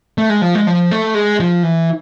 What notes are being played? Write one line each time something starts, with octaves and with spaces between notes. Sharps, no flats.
A3
G#3
F3
G#3
F3
A3
G#3
F3
E3